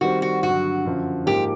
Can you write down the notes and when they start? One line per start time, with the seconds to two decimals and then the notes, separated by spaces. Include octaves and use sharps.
0.01 D#3 G3 C4 F#4
0.22 F#4
0.43 G2 D3 F#3 F#4
0.85 F#2 D3 F3
1.26 G#2 F3 A#3 G4